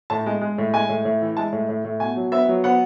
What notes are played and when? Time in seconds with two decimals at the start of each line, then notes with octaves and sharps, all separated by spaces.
0.10 A2 A5
0.26 G#3
0.41 G#3
0.58 A2
0.74 G#3 G#5
0.89 A2
1.05 A2
1.22 E3
1.37 G#3 A5
1.52 A2
1.69 A2
1.85 A2
2.00 B2 G#5
2.16 F#3
2.32 B3 E5
2.49 F#3
2.64 B3 F#5